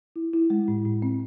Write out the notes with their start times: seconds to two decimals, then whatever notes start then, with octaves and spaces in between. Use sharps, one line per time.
0.16 E4
0.33 E4
0.50 G#3
0.68 A2
0.85 A2
1.02 C4